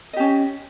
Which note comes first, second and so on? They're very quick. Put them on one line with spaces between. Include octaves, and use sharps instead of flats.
D#5 G4 C#4